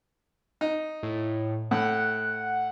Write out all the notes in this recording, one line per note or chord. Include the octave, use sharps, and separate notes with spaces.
D#4
A2
A2 F#5